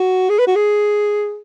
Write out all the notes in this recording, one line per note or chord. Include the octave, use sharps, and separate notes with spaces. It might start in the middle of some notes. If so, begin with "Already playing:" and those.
Already playing: F#4
G#4
B4
F#4
G#4